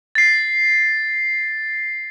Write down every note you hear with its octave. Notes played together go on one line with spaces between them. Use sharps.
A6 C7